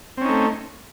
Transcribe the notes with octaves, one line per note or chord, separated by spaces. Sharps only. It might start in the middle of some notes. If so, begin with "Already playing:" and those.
A3 C4 C#4 D#4